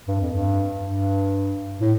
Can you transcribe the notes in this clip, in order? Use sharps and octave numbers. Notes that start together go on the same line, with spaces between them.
G2
F2
G2
G2
A2